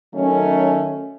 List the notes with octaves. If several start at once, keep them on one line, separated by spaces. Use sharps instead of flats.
D#3 F#3 A3 C#4